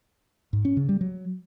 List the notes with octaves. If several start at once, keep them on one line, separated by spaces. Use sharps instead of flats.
G#2
C#4
C#3
G3
F#3